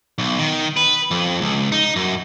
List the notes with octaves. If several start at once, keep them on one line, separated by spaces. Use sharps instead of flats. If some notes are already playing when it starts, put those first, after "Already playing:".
B1
D#3
B4
F2
C#2
D#4
F#2